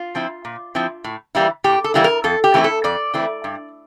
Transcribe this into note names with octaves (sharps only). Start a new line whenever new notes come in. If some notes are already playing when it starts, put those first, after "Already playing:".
Already playing: F4
F3 C4 E4
A#2
F3 C4 E4
A2
E3 G3 A#3 E4
A2 G4
A4
E3 G3 A#3 E4
A#4
F2 A4
G4
E3 A3 C4 E4
A4
F2 D5
E3 A3 C4 E4
G2